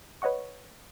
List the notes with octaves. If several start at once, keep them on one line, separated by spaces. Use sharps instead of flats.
B4 C#5 D#5 F#5 C#6